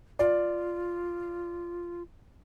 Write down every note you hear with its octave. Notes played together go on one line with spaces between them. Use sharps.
F4 D5